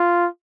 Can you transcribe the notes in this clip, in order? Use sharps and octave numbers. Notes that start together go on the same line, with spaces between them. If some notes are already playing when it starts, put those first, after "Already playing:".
Already playing: F4